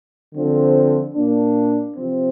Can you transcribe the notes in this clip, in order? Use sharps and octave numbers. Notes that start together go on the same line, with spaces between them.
D3 F3 C4
A#2 A#3 D4
C3 F3 C4